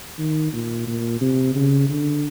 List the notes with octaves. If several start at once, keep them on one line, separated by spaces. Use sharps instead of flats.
D#3
A#2
A#2
C3
C#3
D3